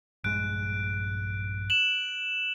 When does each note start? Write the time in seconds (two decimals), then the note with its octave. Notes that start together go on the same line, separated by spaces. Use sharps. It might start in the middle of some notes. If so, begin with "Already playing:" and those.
0.24 A#1 G2 G#3 F#6 D7
1.70 E7 F#7